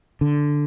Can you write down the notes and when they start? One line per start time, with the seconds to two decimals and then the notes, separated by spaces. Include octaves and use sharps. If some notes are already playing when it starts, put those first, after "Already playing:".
0.21 D3